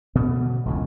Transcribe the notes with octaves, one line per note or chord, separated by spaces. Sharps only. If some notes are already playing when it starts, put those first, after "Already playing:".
B2 D3 B3
E1 C#2 A2